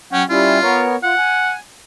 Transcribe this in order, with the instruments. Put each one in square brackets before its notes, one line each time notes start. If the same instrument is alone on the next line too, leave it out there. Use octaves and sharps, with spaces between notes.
[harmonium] F#3 F#5 G5 [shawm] C#4
[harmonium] G3 C#4 E4 [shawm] F4
[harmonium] B3 A#4 C#5
[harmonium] F4 [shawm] F#5
[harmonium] G#5